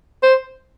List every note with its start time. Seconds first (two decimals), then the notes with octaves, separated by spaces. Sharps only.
0.23 C5